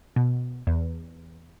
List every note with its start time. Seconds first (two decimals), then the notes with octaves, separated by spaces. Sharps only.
0.16 B2
0.67 E2